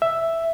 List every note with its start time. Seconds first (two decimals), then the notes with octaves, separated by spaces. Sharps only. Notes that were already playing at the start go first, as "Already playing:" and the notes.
0.02 E5